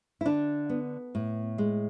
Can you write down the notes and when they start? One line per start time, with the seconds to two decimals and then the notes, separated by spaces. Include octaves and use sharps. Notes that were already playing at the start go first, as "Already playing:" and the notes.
0.21 E4
0.26 D3 D4
0.70 B3
1.15 A2
1.58 G#3